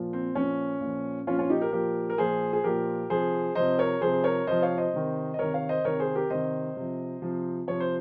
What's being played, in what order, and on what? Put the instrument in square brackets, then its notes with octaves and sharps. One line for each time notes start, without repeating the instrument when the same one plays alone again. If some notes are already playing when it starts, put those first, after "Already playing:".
Already playing: [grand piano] A#2 F3
C4
A#2 F3 C#4
A#2 F3
A#2 F3 C#4 F4
C#4 F4
D#4 G4
G4 A#4
A#2 F3 G4 A#4
A#4
A#2 F3 G#4 C5
G#4
A#2 F3 G4 A#4
C3 F3 G#4 C5
C3 F3 C5 D#5
A#4 C#5
C3 F3 G#4 C5
A#4 C#5
C3 F3 C5 D#5
C#5 F5
C5 D#5
C3 D#3
D#5
C3 D#3 A#4 C#5
C#5 F5
C5 D#5
C3 D#3 A#4 C#5
G#4 C5
G4 A#4
C3 D#3 C5 D#5
C3 F3
C3 F3
C3 F3 C#5
C5